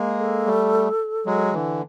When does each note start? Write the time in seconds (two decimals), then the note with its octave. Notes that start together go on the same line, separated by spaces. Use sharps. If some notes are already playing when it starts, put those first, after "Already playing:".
Already playing: G#3 A#3
0.19 A4
0.46 G3 A3
1.26 F#3 G#3
1.53 D3 E3